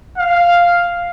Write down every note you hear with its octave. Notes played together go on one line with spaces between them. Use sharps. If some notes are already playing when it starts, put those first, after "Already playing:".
F5